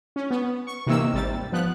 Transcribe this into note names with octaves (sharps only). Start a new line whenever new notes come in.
C#4
B3
C#6
C3 D#3 E3 A#3 E6
G#1 C3 G3 A6
F3 B3 F#6